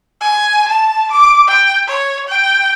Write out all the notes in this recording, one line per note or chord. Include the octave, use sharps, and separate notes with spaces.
G#5
A5
D6
G5
C#5
G5